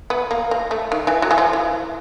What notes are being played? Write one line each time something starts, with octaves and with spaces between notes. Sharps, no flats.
B3
A#3
A#3
A3
D#3
E3
F#3
E3
F3
E3